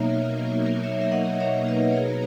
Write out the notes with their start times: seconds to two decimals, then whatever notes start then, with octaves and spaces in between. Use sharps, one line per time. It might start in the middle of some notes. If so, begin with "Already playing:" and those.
Already playing: B2 F#3 A#3 D#4 A#4 C#5 E5
0.84 C#5 E5
1.01 E5
1.12 D#5 F#5
1.40 C#5 E5
1.68 B4 D#5
1.92 C#5
1.97 G#4 B4